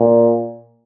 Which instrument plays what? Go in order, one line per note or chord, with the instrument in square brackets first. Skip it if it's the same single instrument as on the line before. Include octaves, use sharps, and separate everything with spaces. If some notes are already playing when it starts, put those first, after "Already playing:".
Already playing: [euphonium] A#2